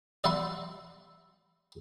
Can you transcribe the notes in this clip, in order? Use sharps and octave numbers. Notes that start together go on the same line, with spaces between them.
D5 E5 F#5 B5 C6